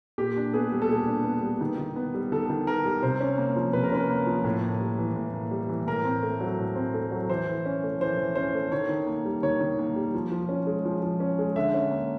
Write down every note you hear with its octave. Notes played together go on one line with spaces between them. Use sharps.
A#2 G4
D4
B3 G#4
G3
A4
A#2 G#4
D4
B3
G3
D#3
D#3
B3
G3
D#3 A4
D#3
B3 A#4
G3
C3 C5
C#4
A#3
F3
C3 B4
A#4
C#4 B4
A#3
F3
A2
A#3
G3
E3
A2
A#3
G3
E3
A2 A#4
C4
A3
F#3
A2
C4
A3
F#3
E3 C5
E3
C#4
A3
E3 C5
E3
C#4 C5
A3
D#3 C#5
D#3
A#3
G3
D#3 C#5
D#3
A#3
G3
F3
F3
C#4
G#3
F3
F3
C#4
G#3
D3 E5
C#4
A#3